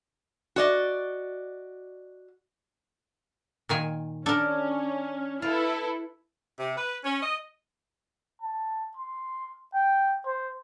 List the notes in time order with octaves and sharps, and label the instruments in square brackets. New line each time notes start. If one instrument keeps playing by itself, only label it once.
[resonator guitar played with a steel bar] F#4 D5 D#5
[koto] A#2 D#3 G#5
[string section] C#4 [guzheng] D4 A#4 [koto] A4
[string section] E4 A4 B4 [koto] F4
[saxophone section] C3
B4
C#4
D#5
[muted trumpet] A5
C6
G5
C5